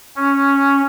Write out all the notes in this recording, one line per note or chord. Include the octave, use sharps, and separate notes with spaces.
C#4